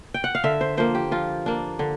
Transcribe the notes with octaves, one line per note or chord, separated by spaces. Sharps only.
G5
F#5
F5
D3 E5
C5
F3 A#3 C5
G4
F3 F4
A#3 D4
D3